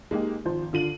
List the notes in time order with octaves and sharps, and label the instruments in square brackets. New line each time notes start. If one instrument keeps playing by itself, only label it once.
[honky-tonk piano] G#3 A#3 D#4 G4
G#1 F3 C5
D3 F4 D#7 F#7